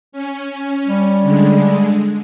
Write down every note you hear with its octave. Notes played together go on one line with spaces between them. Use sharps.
C#4
G3
D3 G#3